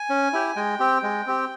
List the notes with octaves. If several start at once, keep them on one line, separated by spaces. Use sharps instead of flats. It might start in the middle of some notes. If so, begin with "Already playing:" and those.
Already playing: G#5
C#4
E4 G4
G#3 G5
C4 G4
G#3
C4 G4